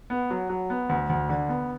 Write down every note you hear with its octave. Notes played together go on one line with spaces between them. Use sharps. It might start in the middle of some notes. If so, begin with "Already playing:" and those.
B3
F#3
F#3
B3
D2
D2
D3
B3